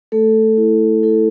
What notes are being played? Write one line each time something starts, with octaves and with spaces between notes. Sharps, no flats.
A3 A4
E4
E4 A4